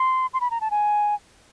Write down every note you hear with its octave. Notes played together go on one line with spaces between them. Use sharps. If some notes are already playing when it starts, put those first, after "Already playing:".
Already playing: C6
C6
B5
A#5
A5
G#5